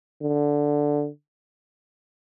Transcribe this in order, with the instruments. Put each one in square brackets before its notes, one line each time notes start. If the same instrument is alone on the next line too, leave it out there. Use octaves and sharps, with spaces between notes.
[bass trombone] D3